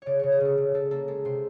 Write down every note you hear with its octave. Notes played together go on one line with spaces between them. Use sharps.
C#3 C#5 D5
C#3 C#5
G#4
C#3 A4
C#3
C#3 A4
A#3 A4
G#3 A4
C3 C5